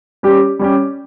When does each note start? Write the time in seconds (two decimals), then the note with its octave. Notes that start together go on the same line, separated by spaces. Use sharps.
0.23 G3 C#4 G4
0.59 G3 C#4 G4